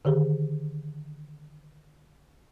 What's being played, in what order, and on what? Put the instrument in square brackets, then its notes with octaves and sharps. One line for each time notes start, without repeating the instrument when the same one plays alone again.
[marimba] D3 D#3 G4 G#4